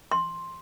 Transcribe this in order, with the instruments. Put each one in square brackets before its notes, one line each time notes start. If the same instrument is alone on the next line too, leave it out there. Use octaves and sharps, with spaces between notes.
[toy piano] C6